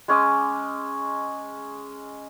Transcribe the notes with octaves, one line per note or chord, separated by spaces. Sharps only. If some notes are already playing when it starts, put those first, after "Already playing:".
G#3 C#4 D6 D#6